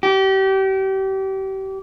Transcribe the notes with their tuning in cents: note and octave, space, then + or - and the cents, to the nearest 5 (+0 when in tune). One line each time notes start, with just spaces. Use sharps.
G4 -30